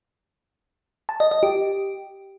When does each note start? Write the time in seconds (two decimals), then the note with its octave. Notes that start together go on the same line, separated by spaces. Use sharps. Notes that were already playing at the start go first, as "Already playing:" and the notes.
1.09 A5
1.20 D#5
1.31 D#5
1.43 G4